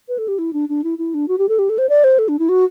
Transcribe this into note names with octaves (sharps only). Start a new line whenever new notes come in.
B4
A4
G4
E4
D4
D4
E4
E4
D4
F#4
G4
A4
G4
A4
C5
D5
C5
A4
D4
E4
F#4